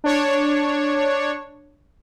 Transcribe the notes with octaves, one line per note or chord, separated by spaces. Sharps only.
D4 C#5